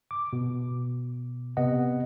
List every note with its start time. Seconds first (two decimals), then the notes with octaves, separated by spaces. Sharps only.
0.11 D6
0.33 B2
1.57 C3 B3 D#5 F#5